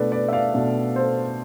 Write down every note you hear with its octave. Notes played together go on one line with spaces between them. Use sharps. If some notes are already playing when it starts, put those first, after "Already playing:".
Already playing: B2 A3 D4 B4 D5
B4 D5
E5
D5 F5
B2 A3 D4
A4 C5